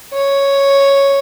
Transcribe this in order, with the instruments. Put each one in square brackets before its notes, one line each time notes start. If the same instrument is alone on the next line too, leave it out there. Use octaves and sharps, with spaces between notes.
[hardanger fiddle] C#5